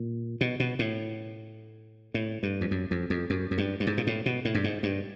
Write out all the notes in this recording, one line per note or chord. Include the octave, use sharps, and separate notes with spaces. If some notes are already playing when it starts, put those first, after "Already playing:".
Already playing: A#2
B2
B2
A2
A2
G2
F2
F#2
F2
F2
F#2
F#2
G2
G2
G#2
A#2
A2
B2
A2
G2
G#2
G2